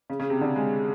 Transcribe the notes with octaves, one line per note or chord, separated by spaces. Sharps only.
C#3
C#3
C3
D3
G#3